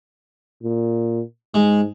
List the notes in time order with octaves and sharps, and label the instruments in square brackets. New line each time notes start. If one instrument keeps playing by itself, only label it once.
[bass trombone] A#2
[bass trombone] G#2 [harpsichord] G#3